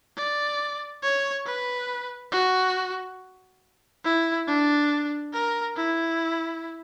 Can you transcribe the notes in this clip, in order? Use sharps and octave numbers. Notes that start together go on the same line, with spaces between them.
D5
C#5
B4
F#4
E4
D4
A#4
E4